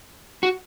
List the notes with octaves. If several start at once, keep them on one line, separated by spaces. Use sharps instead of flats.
F#4